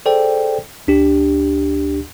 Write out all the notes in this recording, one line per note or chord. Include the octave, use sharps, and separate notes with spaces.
G#4 A4 C5 D5 G5
D2 D4 G4